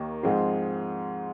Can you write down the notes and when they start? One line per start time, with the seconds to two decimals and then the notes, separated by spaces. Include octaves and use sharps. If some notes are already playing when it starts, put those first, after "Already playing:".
Already playing: D#2 D#3 A#3
0.23 G#2 F3 G#3 C4